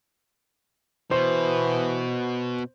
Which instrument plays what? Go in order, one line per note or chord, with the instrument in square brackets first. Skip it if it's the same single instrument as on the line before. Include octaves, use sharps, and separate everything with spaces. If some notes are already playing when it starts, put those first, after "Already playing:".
[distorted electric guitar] B2 [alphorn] E3 [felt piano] C5